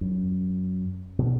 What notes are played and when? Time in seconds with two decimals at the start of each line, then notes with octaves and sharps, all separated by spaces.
0.01 F#2
1.19 B2